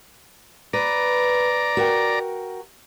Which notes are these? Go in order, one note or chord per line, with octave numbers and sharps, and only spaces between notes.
B4 D5 A#5
F#4 A#4 G5